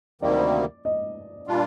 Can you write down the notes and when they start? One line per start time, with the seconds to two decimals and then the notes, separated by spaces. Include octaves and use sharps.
0.22 D2 C3 D#3 G3 A#3 D5
0.85 D#5
1.47 A#2 G3 D4 F4